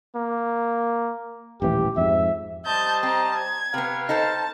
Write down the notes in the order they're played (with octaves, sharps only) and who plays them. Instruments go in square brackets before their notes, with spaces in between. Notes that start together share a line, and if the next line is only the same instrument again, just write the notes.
[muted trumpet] A#3
[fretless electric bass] D#1 A1 E3 [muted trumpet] G4
[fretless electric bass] F2 G#2 [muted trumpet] E5
[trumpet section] G3 C5 D#5 [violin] A5 G6
[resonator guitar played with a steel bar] C4 [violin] A5 A#5
[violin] G#6
[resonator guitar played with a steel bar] C3 B3 [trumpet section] B4 F5 G5
[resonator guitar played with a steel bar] D#4 A4 C5 [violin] A5